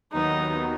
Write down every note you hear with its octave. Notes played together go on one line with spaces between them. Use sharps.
D#2 D#3 F#3 B3 D#4